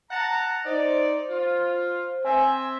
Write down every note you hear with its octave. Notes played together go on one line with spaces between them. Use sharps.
F#5 A5 A#5
D#4 C5 D5
F4
C4 E5 G#5